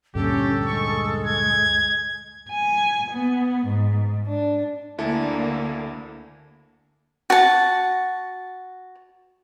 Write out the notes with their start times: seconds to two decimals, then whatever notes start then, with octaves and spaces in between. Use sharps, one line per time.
0.15 D2 G2 A#2 C#4 G4 A4
0.67 G#3 C#6
1.26 G#6
2.49 G#5
3.11 B3
3.65 G#2
4.27 D4
4.98 D2 D3 A#3 E4 A4
7.30 F#4 A5